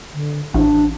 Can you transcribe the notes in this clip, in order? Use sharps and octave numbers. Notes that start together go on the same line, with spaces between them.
D3
A1 D4